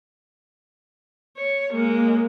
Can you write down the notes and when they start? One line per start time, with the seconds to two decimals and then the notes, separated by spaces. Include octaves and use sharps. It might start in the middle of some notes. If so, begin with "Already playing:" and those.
1.38 C#5
1.73 G#3 A#3